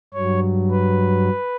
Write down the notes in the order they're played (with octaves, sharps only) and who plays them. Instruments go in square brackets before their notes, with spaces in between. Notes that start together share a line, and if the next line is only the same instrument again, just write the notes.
[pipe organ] G2 F#3 C#5
B4